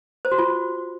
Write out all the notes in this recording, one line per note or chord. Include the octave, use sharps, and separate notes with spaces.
C5
F#4
F4